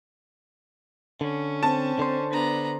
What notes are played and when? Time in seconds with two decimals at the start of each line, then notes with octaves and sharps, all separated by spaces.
1.21 D3 C#4
1.63 C4 A5
1.99 D3 C5
2.31 B3 D4 A#5